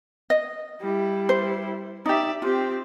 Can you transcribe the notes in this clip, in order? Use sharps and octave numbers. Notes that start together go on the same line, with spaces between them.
D#5
G3 E4
C5
D#4 G4 D5 E5
C4 F4 G4